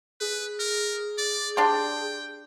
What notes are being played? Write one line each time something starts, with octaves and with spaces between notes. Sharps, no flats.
G#4 B4
A#4
D5
D4 G4 G5 C6